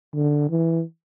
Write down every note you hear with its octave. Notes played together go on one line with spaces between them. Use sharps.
D3
E3